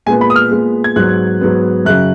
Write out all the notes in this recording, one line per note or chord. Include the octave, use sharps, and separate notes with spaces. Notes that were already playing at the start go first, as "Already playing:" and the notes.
A#2 G#3 B3 G#5
B5
D#6
F6
A#2 G#3 B3
G#6
G#2 F#3 B3 F#6
G#2 F#3 B3
F#2 C#3 F#3 F#6